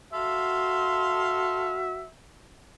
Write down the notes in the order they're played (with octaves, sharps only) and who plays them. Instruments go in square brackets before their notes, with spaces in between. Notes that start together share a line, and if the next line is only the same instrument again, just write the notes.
[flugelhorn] F#4 [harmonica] A4 F5 C6 [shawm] E5